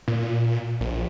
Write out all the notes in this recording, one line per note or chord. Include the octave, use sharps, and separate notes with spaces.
A#2
A#1